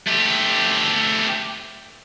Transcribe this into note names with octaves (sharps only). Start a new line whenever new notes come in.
A3 G4